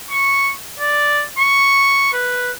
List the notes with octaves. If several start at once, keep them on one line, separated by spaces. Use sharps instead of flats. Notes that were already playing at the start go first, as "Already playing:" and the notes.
C#6
D5
C#6
B4